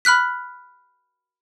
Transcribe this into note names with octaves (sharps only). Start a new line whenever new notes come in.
B5 F6 F#6 B6